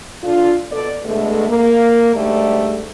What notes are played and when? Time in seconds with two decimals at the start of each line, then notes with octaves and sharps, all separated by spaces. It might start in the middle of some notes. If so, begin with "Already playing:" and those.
0.24 D3 D4 F4
0.72 B2 A4 D5
1.06 B2 D3 G#3 A3
1.49 A#3
2.15 G#2 D3 G3 A3